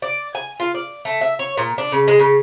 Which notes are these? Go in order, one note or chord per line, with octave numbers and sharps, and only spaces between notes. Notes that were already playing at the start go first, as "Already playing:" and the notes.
D5
G#5
F4
D5
A3
E5
C#5
A#2
D4
C#3
G#3
C#3